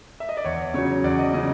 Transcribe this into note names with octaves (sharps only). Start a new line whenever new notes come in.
E5
D#5
D5
E2 C#5
C#3 F#3 C#5
E2 D5
D#5
C#3 F#3 D#5